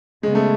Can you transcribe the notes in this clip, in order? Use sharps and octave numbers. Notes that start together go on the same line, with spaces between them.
C#3 F#3 G#3 B3
A3